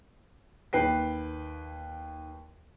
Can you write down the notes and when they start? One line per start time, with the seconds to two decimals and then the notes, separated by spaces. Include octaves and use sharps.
0.73 D#2 B4 G5 C7